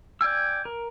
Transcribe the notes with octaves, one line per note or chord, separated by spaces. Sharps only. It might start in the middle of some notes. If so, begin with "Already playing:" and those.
D5 G5 G#5 E6
A#4